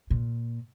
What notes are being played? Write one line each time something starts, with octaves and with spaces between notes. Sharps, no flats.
A#2